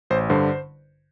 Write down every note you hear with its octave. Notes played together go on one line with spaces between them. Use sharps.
A1 C5
G2 D3 C5